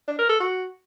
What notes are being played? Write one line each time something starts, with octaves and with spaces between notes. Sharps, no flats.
D4
A#4
A4
F#4